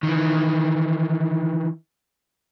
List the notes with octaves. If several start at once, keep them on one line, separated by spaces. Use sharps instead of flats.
D#3 E3